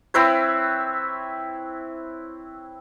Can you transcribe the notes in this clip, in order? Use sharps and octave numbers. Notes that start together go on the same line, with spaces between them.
C4 E4 B4 C#5